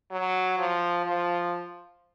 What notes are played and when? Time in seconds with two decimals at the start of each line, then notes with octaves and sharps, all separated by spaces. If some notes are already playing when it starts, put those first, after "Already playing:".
0.11 F#3
0.58 F3
1.06 F3